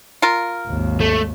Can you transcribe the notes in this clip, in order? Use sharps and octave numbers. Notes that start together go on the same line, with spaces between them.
F4 A#4
G#1 D#2
A3